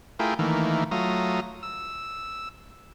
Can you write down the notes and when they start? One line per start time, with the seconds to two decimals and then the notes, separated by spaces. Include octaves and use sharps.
0.19 A3 E4 F4 G#4 A#4 G5
0.39 D#3 E3 A3 A#3
0.91 F#3 A3 F4 A#5 D#6
1.63 E6